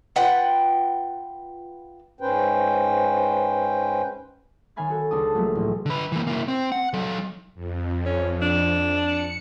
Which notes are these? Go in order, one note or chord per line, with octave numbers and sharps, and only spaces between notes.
F4 B4 F#5 G5
G#2 C#4 B4 C5 G5
D#3 C#4 F5 G#5 B5 A6
F#4 A4
C#2 C#4 D4 A5 D#6
F3 F#3 A3 A#3
A1
D3 B4
E3 A#3
A#3 E4
C4
F#5
F#3 A4
F2
C#4
D4
C#7